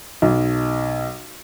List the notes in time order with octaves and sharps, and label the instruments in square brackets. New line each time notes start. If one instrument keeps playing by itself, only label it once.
[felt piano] B1